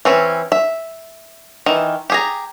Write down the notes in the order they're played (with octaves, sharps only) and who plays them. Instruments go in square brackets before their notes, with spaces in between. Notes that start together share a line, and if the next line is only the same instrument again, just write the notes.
[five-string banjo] E3 C4 C#4
E5
D#3 E3
G4 G#4 A#5